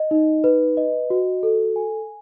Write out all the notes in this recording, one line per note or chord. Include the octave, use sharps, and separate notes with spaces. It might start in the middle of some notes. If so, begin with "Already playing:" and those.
Already playing: D#5
D#4
B4
D#5
F#4
A4
G#5